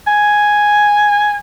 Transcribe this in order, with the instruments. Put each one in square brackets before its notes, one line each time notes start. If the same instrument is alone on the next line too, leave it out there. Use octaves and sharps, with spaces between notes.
[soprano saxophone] G#5